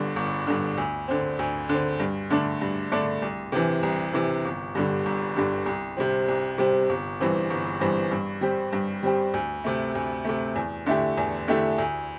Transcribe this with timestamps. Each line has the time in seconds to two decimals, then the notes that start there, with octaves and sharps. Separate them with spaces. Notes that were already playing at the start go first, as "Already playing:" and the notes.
Already playing: G1 G2 D3
0.16 G1
0.47 G2 D3
0.78 D2
1.08 D3 C4
1.39 D2
1.69 D3 C4
2.00 G2
2.30 D3 A3 D4
2.61 G2
2.92 D3 A3 D4
3.22 C2
3.52 C3 E3
3.83 C2
4.13 C3 E3
4.45 G1
4.75 G2 D3 G3
5.06 G1
5.36 G2 D3 G3
5.66 C2
5.97 C3 G3 C4
6.28 C2
6.58 C3 G3 C4
6.90 G1
7.20 G2 E3 C4
7.50 G1
7.80 G2 E3 C4
8.11 G2
8.41 G3 C4 G4
8.73 G2
9.03 G3 C4 G4
9.34 D2
9.64 C3 A3
9.95 D2
10.25 C3 A3
10.55 E2
10.86 D3 A3 E4 G4
11.17 E2
11.48 D3 A3 E4 G4
11.78 D2